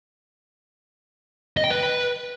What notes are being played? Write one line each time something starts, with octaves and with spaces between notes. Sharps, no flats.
D#5
G5
B4